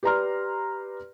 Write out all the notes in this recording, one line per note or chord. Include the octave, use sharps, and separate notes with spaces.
G4 B4 D5 A#5 C6 F6